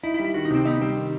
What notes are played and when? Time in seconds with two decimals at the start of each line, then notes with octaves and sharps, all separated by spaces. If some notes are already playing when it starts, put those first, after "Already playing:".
0.03 D#4 E4
0.14 E4
0.19 G3
0.25 E4
0.34 D#3 F#4
0.45 D#4
0.51 C3 C4
0.65 B3 D#4
0.81 G3 C4
0.97 D#3